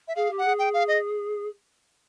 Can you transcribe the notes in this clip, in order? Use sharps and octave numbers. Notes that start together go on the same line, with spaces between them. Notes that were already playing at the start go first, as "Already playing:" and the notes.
E5
G#4 F5
G4
F#5
G#4
G5
F5
D#5